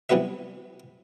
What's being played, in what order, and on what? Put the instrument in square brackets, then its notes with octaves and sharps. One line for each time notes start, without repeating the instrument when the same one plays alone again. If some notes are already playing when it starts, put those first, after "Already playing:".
[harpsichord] C3 E3 G3 B3 F#4 E5